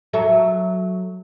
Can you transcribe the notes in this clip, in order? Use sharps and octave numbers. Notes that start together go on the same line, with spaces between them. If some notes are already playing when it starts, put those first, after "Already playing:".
F#3 A4 E5